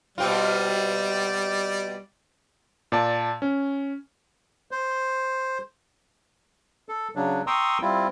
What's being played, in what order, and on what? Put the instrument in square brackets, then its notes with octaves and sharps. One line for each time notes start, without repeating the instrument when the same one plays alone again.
[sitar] B2 C4 F4 [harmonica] G3 D5
[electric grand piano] A#2 D5 A5
C#4
[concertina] C5
[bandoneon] A4
C#3 F#3 D4
G5 A#5 C6 C#6 D#6 E6
G3 C4 E4 F4